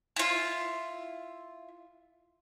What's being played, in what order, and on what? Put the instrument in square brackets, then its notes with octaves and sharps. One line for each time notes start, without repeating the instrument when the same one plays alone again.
[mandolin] E4 F4